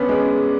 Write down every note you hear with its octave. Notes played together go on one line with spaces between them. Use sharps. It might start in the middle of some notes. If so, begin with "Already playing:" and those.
Already playing: B3 C#4 D4
G#3